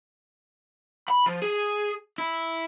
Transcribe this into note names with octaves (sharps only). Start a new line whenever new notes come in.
B5
F3
G#4
E4